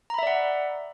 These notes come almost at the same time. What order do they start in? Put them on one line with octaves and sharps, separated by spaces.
A#5 B5 E5 D5 F#5